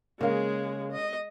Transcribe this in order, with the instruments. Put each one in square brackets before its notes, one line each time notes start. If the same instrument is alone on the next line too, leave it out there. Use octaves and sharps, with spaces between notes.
[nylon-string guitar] C#3 F5 [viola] G#3 G#4 [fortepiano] A#3
[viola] D#5